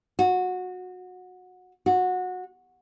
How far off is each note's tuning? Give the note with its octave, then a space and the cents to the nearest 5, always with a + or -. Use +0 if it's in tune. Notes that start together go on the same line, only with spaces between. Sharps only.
F#4 -20
F#4 -20